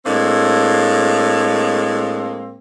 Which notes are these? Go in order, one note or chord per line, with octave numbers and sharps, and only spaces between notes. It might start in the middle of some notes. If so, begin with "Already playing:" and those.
A2 G#3 A#3 C4 D4